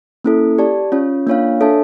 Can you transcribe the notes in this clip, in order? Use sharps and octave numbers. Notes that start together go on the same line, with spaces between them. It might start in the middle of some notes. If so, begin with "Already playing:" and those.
A#3 C#4 E4 A4
G4 D5 A5
C#4 F4 C#5
A#3 D4 F4 C#5 F5
D4 A4 C#5 E5 A5